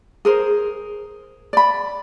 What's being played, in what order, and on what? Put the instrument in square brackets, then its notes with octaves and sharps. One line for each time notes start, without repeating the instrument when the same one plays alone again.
[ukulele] G#4 A#4 C5
D5 B5